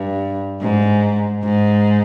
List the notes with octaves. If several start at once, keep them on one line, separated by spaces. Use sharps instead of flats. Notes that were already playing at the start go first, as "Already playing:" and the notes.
Already playing: G2
G#2
G#2